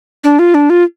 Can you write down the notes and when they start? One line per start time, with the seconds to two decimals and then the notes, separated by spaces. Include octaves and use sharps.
0.24 D4
0.39 F4
0.54 D4
0.70 F4